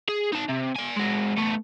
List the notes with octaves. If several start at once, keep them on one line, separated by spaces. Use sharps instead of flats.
G#4
D#4 A5
C3
D5 G#5
G#3 F#4
A3 B3